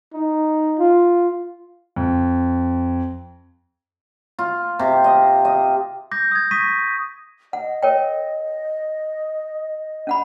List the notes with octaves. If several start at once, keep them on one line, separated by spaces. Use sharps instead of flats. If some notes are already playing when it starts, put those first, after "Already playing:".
D#4
F4
F2
F4
C3
D#5
D#5
D6 G6 A#6
D#6 G#6
C#6 D#6 A#6 B6 D#7
D#5 F#5
A#4 C#5 G5
C#4 F#5 B5